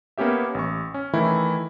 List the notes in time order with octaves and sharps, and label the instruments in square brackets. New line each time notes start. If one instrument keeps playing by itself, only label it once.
[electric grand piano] A#3 B3 C#4 G4 E5
A1 C#6
C#4
D#3 E3 A3 E4